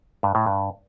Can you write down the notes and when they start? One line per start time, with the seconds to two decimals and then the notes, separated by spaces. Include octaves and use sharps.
0.23 G2
0.35 A2
0.46 G2